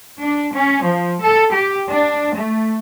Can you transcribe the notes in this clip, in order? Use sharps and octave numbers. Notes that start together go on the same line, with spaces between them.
D4
C#4
F3
A4
G4
D4
A3